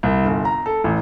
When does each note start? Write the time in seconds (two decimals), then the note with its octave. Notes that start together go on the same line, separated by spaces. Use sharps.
0.03 C2
0.25 G1
0.45 A#5
0.66 A4
0.84 A1